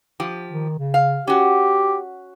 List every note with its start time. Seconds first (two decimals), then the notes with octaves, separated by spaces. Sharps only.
0.20 F3 G4
0.50 D#3
0.79 C#3
0.94 F5
1.27 C#4 F#4 G4